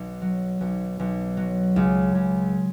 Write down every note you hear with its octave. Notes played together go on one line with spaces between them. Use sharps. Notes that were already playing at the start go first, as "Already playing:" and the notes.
Already playing: B1
F#3
B1
B1
F#3
C#2
C#2